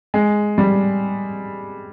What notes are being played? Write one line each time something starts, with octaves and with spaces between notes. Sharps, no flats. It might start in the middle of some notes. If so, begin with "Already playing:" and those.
G#3
G3